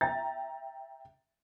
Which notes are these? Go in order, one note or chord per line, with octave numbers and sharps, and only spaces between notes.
E5 G5 A#5 A6